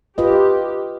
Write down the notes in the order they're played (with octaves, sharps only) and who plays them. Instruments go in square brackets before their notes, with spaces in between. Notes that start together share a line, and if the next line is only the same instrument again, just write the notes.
[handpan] F4 B4 D#5 [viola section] G4